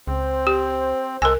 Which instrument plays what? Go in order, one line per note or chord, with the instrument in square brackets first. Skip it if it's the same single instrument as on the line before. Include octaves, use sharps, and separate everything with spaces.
[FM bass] C#2 [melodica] C4 [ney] C5
[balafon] G4
[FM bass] C2 [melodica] G#3 A4 [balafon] A#4 G#5